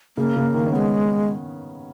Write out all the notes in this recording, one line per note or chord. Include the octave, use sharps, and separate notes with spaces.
C#3 A#3
C#3
D#3
C#4
G#3 A#3 B3